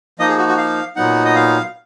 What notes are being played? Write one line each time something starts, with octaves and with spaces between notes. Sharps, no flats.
F3 A#3 D#4 D#5
G#4
F#4
F#4
F5
A#2 F#3 B3 D#4 F#5
D#5
F5